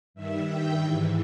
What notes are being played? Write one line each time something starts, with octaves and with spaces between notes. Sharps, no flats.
G2 D#3 E5
G5
G#2 E3